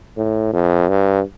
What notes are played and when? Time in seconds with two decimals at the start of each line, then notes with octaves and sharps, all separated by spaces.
0.16 A2
0.53 F2
0.89 G2